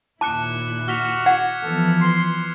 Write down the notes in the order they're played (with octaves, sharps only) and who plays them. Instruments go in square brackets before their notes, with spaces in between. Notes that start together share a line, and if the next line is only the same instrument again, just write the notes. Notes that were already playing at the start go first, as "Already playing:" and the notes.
[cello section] D#2 A#2 E4 [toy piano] A5 [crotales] D6 F#6 C#7
[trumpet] F#4 [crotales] F6 B6 F7
[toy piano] F#5 [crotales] G#6 C#7
[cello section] E3 F3 B3 [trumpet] A4
[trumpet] C6 [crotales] C7